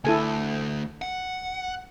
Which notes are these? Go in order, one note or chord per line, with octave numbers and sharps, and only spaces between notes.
D2 E4 A4 G#5
F#5